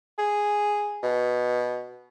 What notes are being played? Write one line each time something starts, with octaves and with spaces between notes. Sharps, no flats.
G#4
B2